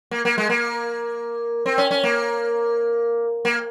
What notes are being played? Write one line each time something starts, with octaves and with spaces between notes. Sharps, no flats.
A#3
A#3
G#3
A#3
C4
C#4
C#4
A#3
A#3